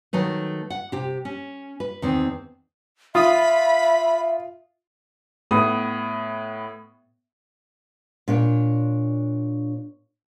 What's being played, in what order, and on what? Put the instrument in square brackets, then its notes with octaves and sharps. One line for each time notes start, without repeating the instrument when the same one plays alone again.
[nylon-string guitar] D#3 F#3 A3 B4
F#5
C3 G4
C#4
B4
E2 D#3 C4
[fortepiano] F4 D#6 [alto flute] E5 [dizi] B5
[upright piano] A2 B3 D#6
[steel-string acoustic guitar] A#2 D4 C#5